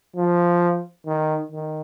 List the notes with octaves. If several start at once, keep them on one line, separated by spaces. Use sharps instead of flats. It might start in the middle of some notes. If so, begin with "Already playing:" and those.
F3
D#3
D#3